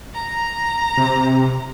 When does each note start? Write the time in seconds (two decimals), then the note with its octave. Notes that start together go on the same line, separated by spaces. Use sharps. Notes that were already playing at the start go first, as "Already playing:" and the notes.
0.14 A#5
0.97 C3